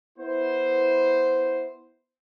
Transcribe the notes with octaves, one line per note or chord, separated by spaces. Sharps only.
B3 E4 C5